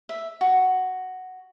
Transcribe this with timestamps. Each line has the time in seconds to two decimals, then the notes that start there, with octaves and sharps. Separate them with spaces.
0.09 E5
0.41 F#4